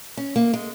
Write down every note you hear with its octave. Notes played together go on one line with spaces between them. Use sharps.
C#4
A#3
G#3